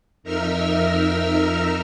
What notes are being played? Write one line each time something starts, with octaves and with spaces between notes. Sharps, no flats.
F2 D#4 A#4 E5 E6 F6